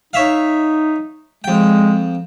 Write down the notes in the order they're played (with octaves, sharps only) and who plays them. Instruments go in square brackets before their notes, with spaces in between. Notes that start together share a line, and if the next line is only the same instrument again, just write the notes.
[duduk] D#4 [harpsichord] C#5 E5 F5
[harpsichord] F2 G5 [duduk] G#3